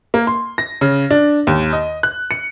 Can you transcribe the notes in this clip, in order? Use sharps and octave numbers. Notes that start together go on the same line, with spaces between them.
A#3
C6
A#6
C#3
D4
D#2
D#5
F#6
C#7